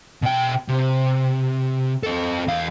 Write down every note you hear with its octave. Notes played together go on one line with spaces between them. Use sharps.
B2 G5
C3
C4 A4
E2 F5